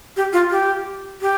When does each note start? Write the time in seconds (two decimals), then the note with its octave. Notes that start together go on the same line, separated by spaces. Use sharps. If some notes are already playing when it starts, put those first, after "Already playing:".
0.17 G4
0.33 F4
0.51 G4
1.21 G4